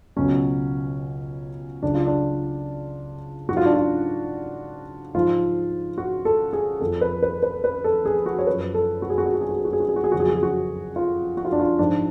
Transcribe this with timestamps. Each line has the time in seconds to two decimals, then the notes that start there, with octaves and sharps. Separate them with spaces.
0.16 C#2 B2 F#3 C#4
1.82 C#2 C#3 F#3 D4
1.94 F4
2.07 D4
3.48 G#2 F#3 F#4
3.57 F4
3.65 D4
3.73 F4
5.14 G#2 F3 F4
5.98 F#4
6.25 A4
6.53 G#4
6.81 F2 F3 A4
7.01 B4
7.22 B4
7.43 B4
7.64 B4
7.84 A4
8.05 G#4
8.26 F#4
8.39 C#5
8.47 F#2 F3 B4
8.74 A4
9.02 F#4
9.10 G#4
9.18 F#4
9.26 G#4
9.34 F#4
9.41 G#4
9.49 F#4
9.57 G#4
9.65 F#4
9.73 G#4
9.80 F#4
9.88 G#4
9.96 F#4
10.04 G#4
10.12 F2 C#3 F#3 F#4
10.20 G#4
10.28 F#4
10.35 G#4
10.43 F#4
10.96 F4
11.37 F#4
11.45 F4
11.52 D4
11.60 F4
11.79 G#2 F3 D4